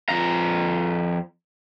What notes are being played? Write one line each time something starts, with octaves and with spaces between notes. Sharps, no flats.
F2 A#5